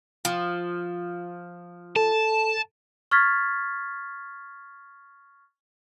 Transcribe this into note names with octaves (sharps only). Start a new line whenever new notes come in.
F3
A4 A5
C#6 F6 G#6 A6 B6